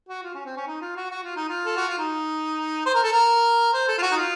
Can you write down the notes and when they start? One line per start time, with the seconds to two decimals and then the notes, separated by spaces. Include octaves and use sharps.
0.09 F#4
0.23 F4
0.34 C#4
0.45 C4
0.56 C#4
0.67 D#4
0.82 F4
0.96 F#4
1.11 F#4
1.24 F4
1.36 D#4
1.49 F4
1.66 A4
1.76 F#4
1.87 F4
1.98 D#4
2.86 C5
2.94 A#4
3.03 A4
3.12 A#4
3.73 C5
3.88 A4
3.98 F4
4.02 F#4
4.11 D#4
4.17 F4